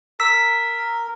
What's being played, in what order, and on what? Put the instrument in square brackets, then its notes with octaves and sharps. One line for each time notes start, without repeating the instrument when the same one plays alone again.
[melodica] A#4 [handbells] E6 B6